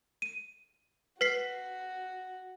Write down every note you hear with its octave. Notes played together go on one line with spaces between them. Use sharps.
D#7
F#4 B4 B6 C7